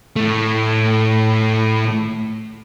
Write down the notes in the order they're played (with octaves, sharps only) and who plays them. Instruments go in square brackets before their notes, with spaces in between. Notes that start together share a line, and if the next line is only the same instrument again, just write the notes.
[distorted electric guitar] A2 A3